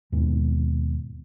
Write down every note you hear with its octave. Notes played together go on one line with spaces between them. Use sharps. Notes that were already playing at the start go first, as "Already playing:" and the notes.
D#2 G#2 B2